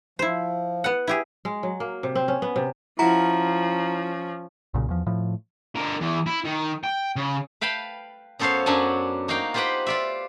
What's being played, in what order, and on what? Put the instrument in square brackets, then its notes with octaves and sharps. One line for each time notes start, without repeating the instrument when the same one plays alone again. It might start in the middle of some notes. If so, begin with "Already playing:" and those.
[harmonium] F3 [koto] E4 C5
[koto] B3 F#5
E4 G4 G#4
[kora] G#3
F#3
A#3
C3
C4
C#4
B3
C3
[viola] F3 C#4 [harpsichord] E4 F#4 [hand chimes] A#5
[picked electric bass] B1 A#2 C#3
E2 F3
A2 F3
[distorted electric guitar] D3 A#4
E2 E3
E4
D#3
G5
C#3
[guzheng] B4 F5 G5 A5 B5
F#2 B3 A4 C5 C#5 F5
F#2 F#3 D4 F#5 G#5 A5
A#3 D#4 F#4 F5 G5
F4 G4 B4 C5 F#5 G5
F4 D5 E5